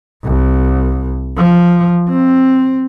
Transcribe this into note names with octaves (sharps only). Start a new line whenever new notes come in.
C2
F3
C4